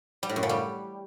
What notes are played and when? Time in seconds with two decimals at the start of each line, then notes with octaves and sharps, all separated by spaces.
0.23 G3
0.29 A2
0.36 F#2
0.43 C#3
0.49 G3